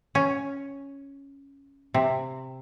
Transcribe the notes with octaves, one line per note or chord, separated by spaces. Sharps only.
C#4
C3